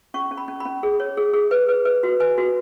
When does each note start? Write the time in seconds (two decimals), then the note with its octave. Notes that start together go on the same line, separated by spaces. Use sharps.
0.14 C#4 C#6
0.31 C#4
0.37 B5
0.48 C#4
0.60 C#4 B5
0.83 G#4
1.00 C#5
1.17 G#4
1.33 G#4
1.51 B4
1.68 B4
1.85 B4
2.03 F#4
2.20 B4 G#5
2.38 F#4